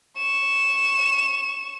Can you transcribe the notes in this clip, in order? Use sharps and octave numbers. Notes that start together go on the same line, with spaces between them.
C#6 E7